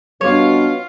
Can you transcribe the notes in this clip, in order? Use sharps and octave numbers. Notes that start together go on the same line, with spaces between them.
B2 G3 D4 F4 C#5 F5